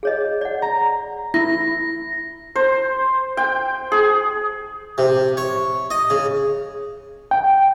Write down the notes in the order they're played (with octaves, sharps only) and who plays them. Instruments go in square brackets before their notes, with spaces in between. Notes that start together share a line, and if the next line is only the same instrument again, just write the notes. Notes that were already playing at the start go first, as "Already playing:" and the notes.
[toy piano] G#4 C#5 D#5
D5 F#5
[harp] A#5
[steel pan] E4 [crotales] A#6
[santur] C5
G5
G#4
[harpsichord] C3
C#5
D#5
C#3
[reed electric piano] G5